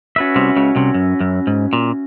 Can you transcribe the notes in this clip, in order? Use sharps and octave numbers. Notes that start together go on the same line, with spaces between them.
C#4 F#4 B4 E5
C2 C3
C#2 C#3
C2 C3
F#2
F#2
G#2
A#2